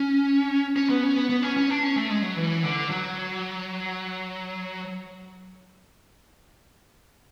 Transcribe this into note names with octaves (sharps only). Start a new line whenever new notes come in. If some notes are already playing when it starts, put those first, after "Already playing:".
Already playing: C#4
C#4
B3
C#4
B3
B3
C#4
C#4
D4
C#4
A3
G#3
F#3
E3
D3
F#3